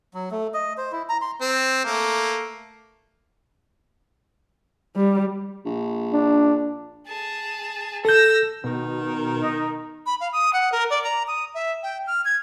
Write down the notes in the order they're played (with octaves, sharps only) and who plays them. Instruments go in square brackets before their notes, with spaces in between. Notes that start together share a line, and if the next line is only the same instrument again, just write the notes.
[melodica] F#3
A3
D#5
C5
E4
A#5
C6
[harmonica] C4
A3 A#3
[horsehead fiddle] G3
[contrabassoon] A#1
[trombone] D4
[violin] G#4 A5
[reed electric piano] A4 G6 [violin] E6 A#6
[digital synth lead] B2 [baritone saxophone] D#3
[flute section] D#4
[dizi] B5
F5
D#6
F#5
A#4
D5
A#5
D#6
E5
G5
F6
G#6